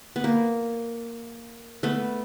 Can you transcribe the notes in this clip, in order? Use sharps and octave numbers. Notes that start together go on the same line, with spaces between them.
B3
A#3
A3 B3